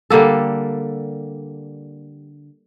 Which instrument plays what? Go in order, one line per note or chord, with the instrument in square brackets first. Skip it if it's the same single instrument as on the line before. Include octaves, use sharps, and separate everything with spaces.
[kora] D3 G3 A#3 A4